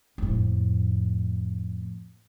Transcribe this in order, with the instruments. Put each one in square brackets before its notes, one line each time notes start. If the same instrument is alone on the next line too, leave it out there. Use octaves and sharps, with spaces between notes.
[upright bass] F2 A2